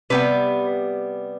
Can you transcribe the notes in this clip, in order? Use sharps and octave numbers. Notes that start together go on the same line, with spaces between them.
C3 G3 B3 B4